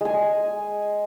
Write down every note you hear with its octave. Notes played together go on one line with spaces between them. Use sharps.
G#3 G#5